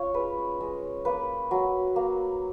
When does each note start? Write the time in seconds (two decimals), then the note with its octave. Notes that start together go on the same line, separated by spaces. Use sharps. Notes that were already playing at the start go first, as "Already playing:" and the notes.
Already playing: C#4 F4 C#5
0.14 G#3 B4
0.61 G#3
1.05 A#3 B4
1.51 F#3
1.96 A#3